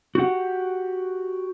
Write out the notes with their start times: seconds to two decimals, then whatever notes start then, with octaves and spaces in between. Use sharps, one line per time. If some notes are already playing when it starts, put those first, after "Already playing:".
0.15 F#4 G4 F#5